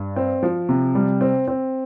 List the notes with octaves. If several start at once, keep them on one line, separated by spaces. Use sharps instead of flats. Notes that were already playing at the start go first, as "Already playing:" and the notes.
Already playing: G2
C4
F3
C3
G3
C4
C4